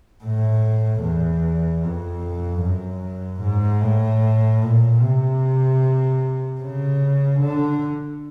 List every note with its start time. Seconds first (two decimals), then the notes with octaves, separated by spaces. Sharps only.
0.24 A2
1.03 E2
1.84 F2
2.62 F#2
3.42 G#2
3.82 A2
4.62 A#2
5.01 C3
6.61 C#3
7.40 D3